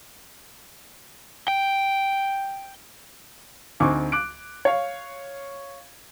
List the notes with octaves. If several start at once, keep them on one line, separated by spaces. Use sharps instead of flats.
G5
D2 C4 D#4 G#5 C#6 D6
D6 F#6 D7
C#5 F5